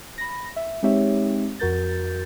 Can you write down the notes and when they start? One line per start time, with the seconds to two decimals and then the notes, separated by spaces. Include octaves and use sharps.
0.18 B5 A#6
0.56 E5
0.83 G#3 C4 D#4 G4 C#5 E5
1.59 F2 F#4 A#4 G6 A6